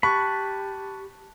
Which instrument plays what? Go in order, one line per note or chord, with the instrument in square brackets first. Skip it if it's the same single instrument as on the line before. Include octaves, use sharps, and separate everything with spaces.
[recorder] G4 [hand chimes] A5 F#6 A6 [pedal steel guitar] B5 [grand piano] C#6